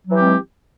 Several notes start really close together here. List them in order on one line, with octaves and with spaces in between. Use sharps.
F#3 E3 G4 C4 G#3